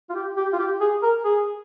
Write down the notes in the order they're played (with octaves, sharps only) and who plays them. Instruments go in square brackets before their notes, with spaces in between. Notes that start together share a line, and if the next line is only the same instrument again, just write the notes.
[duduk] F4
G4
G4
F4
G4
G#4
A#4
G#4